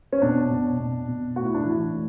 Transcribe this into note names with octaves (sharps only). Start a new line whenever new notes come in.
C#4
B2 D4
B2
B2
B2
A2 F#4
E4
D4
E3 E4
A2